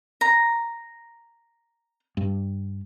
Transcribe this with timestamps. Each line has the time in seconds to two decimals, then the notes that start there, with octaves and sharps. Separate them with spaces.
0.21 A#5
2.17 G2